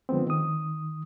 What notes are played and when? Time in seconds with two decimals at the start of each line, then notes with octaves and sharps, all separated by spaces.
0.09 D3 F3 G#3 B3 C4
0.27 D#3 D#6